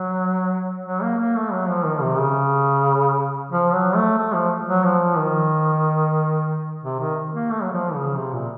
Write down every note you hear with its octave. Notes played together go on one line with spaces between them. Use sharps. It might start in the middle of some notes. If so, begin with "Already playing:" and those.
Already playing: F#3
F#3
A#3
A#3
A3
F#3
F3
D#3
C3
C#3
F3
F#3
A3
A3
F3
F#3
F3
D#3
C3
D#3
A#3
A3
F#3
F3
C#3
C3
A#2